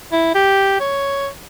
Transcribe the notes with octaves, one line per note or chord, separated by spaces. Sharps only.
E4
G4
C#5